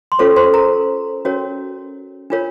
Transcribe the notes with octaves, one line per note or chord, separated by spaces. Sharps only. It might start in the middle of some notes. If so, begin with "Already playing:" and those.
C6
C#4 F4 A4 C5 C#5 C#6
C5 C6
A#4 A#5
C#4 F#4 A#4 C#5
D4 F4 A#4 C#5